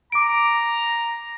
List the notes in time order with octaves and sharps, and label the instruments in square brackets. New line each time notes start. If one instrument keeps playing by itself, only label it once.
[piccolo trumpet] A#5 [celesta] D6 D7